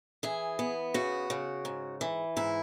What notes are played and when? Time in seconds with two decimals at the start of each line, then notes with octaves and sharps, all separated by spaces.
0.23 E3 G#4
0.59 B3
0.94 C#3 F#4
1.30 C#3
1.65 G#2
2.01 E3
2.37 G#2 E4